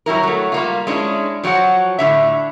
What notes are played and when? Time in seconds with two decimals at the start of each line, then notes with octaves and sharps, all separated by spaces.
0.06 F#3 G3 E4 A#4
0.23 F#3 A3
0.52 G3 A#3 F4
0.87 G#3 C#4 D4 E4
1.43 F3 F#3 F#4 F#5
1.99 A2 D3 E5